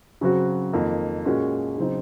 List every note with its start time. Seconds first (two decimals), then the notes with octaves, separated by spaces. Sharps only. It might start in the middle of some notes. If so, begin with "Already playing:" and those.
0.21 C#3 F#3 C4 F#4
0.73 F2 D#3 A#3
1.25 A#2 G#3 C#4 F#4
1.78 C#3 F#3 C4 D#4